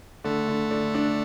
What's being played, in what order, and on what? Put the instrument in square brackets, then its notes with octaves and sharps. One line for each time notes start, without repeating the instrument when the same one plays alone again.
[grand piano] D3 [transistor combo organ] A3
[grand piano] D3
D3
D4